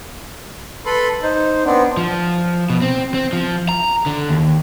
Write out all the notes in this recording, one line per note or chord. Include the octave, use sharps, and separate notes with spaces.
A4 B4 B5 C6
D#4 C5
B3 C4 D4
F3
B2
C4
C4
F3
A#5
D3
D#2